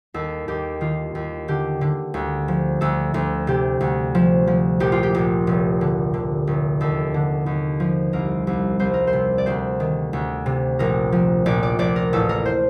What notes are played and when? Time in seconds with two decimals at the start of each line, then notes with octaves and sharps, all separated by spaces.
0.14 D#2 A4
0.48 D#2 G4
0.81 D#3 F4
1.15 D#2
1.48 D3 G4
1.81 D3
2.14 D2
2.48 F3
2.81 D2 A4
3.14 D2
3.47 C3 G4
3.81 D2
4.15 F3
4.47 F3
4.80 A#1 G4
4.92 F4
5.03 G4
5.15 A#1
5.47 F1
5.81 D3
6.14 D3
6.47 F1
6.81 D#2 A4
7.14 D3
7.46 D#2
7.80 F3
8.13 C2 A#4
8.47 C2
8.79 C2 C5
8.94 A#4
9.07 C5
9.13 C3
9.38 D5
9.46 D2 C5
9.80 D#3
10.13 D2
10.46 C3
10.79 A#1 A#4
11.12 F3
11.46 A#1 D5
11.63 D5
11.79 A#1 D5
11.96 A#4
12.13 A1 A4
12.29 A#4
12.45 C5